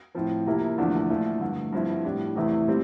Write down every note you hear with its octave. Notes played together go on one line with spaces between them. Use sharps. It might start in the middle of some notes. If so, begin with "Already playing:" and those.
A2 F3 C4
C3 F3 A#3 E4
E2 D3 F3 A3 D4
A#2 F3 A3 E4
G2 D3 A3
G2 F3 C4 E4
A2 G3 D4
E2 C3 E3 A3 E4
A#2 G3 C4